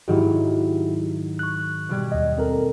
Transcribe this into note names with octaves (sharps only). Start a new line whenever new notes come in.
G#2 D#3 F#3 E4 F#4 G4
C#6 F#6
B2 G3 G#6
D#2 D#5
C4 A4 A#4